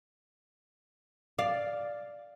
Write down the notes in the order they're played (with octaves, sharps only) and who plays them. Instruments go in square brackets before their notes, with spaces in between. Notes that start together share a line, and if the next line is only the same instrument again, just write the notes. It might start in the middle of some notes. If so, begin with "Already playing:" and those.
[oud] D5 [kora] F5